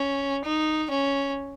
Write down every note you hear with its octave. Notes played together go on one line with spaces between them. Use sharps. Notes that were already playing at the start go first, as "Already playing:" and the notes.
Already playing: C#4
D#4
C#4